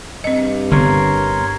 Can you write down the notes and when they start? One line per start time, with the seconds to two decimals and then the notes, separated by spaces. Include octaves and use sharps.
0.24 G2 C4 D#5
0.71 G1 D3 B3 A#4 C#5 C6